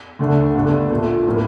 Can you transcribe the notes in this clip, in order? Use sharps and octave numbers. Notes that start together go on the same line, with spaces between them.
D2 D3 A3 D4
G1 G2 D3 A3 D4
A#1 A#2 A3
A2 F3 A#3